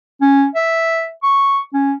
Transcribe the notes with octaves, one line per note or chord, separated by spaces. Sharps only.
C#4
E5
C#6
C#4